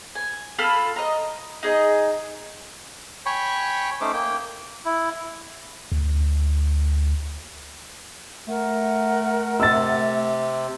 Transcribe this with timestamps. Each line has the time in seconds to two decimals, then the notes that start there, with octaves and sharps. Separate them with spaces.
0.15 G#5
0.58 F4 A4 B5 F6
0.96 D#5 A#5
1.63 D#4 G#4 D#5
3.26 C#5 G5 G#5 B5 C#6
4.01 A3 C#4 D#4 C5 D6
4.13 A#3 G5
4.85 E4
5.92 D2
8.48 A3 A#4 F#5
9.60 C3 E6 A6